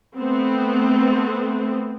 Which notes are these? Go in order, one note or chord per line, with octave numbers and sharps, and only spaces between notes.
A3 B3 C4